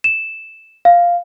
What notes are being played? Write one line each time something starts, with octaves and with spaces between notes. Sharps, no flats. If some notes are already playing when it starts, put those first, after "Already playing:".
E7
F5